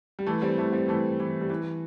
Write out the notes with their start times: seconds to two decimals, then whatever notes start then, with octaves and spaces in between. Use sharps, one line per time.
0.19 G3
0.27 E3 A3
0.42 G3 C4
0.58 E3 A3
0.73 G3 C4
0.88 E3 A3
1.20 E3
1.41 G3
1.50 E3